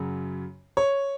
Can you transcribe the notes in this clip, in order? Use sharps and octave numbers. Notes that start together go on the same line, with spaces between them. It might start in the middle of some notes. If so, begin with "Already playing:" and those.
Already playing: F#2 C#3 F#3
C#5